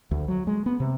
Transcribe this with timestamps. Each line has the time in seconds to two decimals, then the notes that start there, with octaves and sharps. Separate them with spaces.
0.11 D2
0.28 F#3
0.47 G#3
0.66 B3
0.80 C3